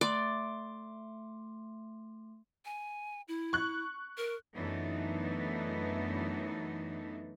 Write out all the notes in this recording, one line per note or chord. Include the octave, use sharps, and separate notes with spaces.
A3 D5 C6 D6
G#5
E4
C#6 F#6
A#4
F#2 E3 A3 B3 D4 D#4